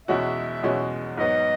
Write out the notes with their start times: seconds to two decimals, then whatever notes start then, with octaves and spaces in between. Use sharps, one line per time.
0.08 E2 B2 G#3 C#4 F#4 E5
0.63 E2 B2 G#3 C#4 F#4
1.18 G#2 F#3 B3 D#5